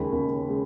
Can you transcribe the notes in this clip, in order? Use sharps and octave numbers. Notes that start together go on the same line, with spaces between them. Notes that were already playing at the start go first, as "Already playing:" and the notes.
Already playing: D#2 C#3 G#3 B5
D#2 C#3 G#3
C#3 G#3